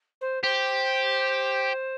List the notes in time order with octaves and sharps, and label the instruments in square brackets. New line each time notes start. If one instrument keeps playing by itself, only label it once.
[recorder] C5
[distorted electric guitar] G4 [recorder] C5